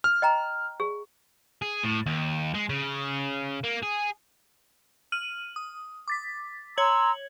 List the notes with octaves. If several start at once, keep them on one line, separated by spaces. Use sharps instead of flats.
F6
D#5 G5 A#5
G#4
G#4
A2
D#2
G#3
C#3
A#3
G#4
F6 D#7 F#7
D#6
D6 A6 B6
C#5 A#5 C6 E6 G#6 F#7